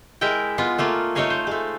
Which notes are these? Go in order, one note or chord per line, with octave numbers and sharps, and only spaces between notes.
G#3 E4 A#4 G5
G#3 B3 F4
A3 A#3 F4
A3 D#4 C#5 D#5 F5 G#5
C5
G#3 A3